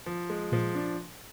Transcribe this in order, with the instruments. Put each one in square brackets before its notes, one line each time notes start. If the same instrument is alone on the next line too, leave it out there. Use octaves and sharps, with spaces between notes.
[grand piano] F3
G#3
[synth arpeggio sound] A#2 [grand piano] F3
[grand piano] D4